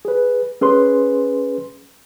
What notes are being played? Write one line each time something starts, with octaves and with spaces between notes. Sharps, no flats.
G#4 B4
C#4 G#4 B4 C6